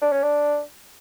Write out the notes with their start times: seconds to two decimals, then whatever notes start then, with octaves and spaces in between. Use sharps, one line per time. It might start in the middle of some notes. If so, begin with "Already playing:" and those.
0.02 D4
0.12 C#4
0.23 D4